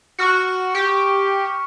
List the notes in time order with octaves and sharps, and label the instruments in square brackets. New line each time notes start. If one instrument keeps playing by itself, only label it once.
[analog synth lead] F#4 [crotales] C#6 F6 C#7
[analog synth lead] G4